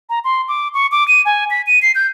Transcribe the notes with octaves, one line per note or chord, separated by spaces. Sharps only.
A#5
C6
D6
C#6
D6
D#7
G#5
B6
D#7
C7
G6